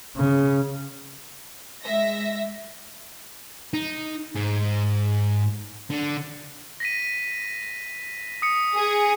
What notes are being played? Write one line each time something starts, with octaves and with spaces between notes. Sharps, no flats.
C#3
G#3 E5 A#6
D#4
G#2
D3
A#6 B6 D#7
D#6 C#7
G#4